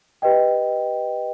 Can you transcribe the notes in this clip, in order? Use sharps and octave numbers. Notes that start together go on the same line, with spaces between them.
G4 B4 D#5 G5